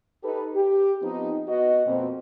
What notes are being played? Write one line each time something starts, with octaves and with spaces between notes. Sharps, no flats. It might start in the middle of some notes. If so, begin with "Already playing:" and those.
D#4 G4 A4 B4
G4
F3 B3 C4 D#4
B3 F#4 D#5
F2 B2 A#3 C4